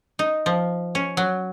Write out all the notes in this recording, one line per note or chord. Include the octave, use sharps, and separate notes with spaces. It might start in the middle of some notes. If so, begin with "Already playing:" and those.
D#4
F3
C#4
F#3